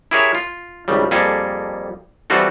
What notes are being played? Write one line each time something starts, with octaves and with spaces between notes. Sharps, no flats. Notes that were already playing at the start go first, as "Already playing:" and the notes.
E4 G4 G#4 A#4 C#5 E5
F4
G#1 C#2 C#3 G3
F2 G3 A#3 G#4 A4
E3 G3 C4 F4 F#4 A4